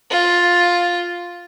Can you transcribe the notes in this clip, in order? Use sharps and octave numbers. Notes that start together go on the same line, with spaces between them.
F4